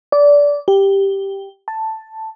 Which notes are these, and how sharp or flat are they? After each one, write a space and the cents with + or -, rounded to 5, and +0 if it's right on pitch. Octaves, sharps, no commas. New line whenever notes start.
D5 -20
G4 +0
A5 +5